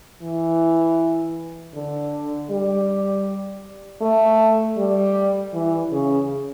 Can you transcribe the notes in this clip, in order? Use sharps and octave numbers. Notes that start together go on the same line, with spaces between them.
E3
D3
G3
A3
G3
E3
C#3